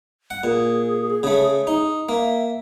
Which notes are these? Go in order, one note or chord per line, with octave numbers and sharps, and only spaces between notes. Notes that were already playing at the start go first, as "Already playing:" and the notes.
F#5
A#2 G#4
C#3 A3
D#4
A#3 E5